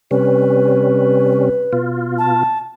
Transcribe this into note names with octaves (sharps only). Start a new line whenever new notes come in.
C3 G3 C#4 B4
B2 F4
A5